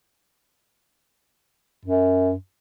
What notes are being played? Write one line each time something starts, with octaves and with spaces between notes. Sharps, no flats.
F#2